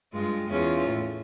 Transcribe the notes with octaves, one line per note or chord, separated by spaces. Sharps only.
G2 G#3 F4
E2 C#4 F4
A2